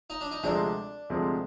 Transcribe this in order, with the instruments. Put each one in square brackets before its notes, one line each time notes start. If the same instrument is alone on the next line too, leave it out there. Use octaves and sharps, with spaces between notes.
[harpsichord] D#4
D4
D#4
[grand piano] D2 C3 F3 G#3 C4 [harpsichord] D4
[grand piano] D2 C3 F3 G#3 C4